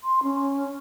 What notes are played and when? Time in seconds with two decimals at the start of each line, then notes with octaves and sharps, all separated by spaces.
0.04 C6
0.23 C#4